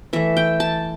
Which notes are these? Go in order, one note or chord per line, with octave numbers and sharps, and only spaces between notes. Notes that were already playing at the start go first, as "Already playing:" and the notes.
E3 A3 E5
G5
A5